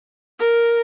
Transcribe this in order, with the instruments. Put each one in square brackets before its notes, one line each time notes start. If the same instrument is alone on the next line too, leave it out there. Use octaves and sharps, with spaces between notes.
[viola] A#4